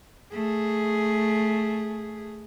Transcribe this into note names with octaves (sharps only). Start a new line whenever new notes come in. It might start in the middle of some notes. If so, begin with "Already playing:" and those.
A3 G#4